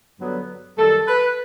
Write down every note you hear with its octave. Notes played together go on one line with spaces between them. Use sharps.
G2 D3 F#3 B3
F#2 D#3 G3 A4
B4